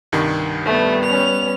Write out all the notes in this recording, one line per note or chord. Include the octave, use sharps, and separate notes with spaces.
C2 G2 D#3
G3 A3 B3
C#4 F7